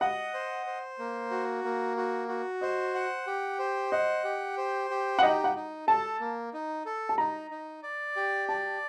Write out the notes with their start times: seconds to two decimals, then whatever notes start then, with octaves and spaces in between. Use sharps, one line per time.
0.01 D#5 F#5
0.34 C5
0.66 C5
0.99 A#3
1.31 F#4
1.64 A#3
1.97 F#4
2.29 F#4
2.61 C5 D#5
2.94 F#5
3.27 G4
3.59 C5
3.92 D#5 F#5
4.24 G4
4.58 C5
4.90 G4
5.19 F#5
5.23 D#4 D#5
5.44 F#5
5.56 D#4
5.87 A4 A5
6.20 A#3
6.54 D#4
6.86 A4
7.09 A5
7.18 D#4 A#5
7.51 D#4
7.83 D5
8.16 G4
8.49 D5 A5